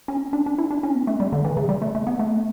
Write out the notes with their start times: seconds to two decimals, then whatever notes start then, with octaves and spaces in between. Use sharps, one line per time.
0.08 C#4
0.33 D4
0.46 D4
0.58 E4
0.71 D4
0.83 C#4
0.95 B3
1.07 A3
1.20 G3
1.32 D3
1.44 E3
1.57 C#3
1.69 G3
1.82 A3
1.95 A3
2.07 B3
2.19 A3